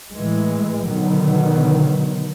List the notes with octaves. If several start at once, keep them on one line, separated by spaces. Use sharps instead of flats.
A2 E3 G#3
B2 D3 D#3 F#3 B3